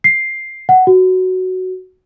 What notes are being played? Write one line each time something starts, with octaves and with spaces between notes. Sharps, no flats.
C7
F#5
F#4